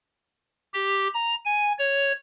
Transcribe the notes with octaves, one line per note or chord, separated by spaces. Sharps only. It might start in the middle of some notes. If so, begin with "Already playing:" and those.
G4
A#5
G#5
C#5